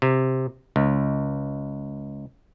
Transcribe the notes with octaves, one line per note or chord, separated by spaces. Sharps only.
C3
C#2